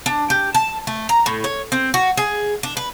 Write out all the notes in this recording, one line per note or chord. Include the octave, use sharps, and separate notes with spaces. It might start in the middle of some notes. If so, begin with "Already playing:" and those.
D4
G4
A5
A3
A#5
A2
C#5
C4
F#4
G#4
D4
B4